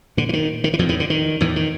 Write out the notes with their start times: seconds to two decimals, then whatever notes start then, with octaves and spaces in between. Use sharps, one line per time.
0.17 A#2 D3
0.29 E3
0.33 D#3
0.64 D#3
0.73 E3
0.79 F2 A2 F3
0.89 E2 E3
1.00 D3
1.10 D#3
1.41 E2 A2 E3
1.56 D#3